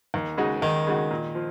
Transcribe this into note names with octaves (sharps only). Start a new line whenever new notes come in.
D#2
C#3 G#3 D#4 F#4
D#2 D#3
C#3 G#3 D#4 F#4
A#2
F3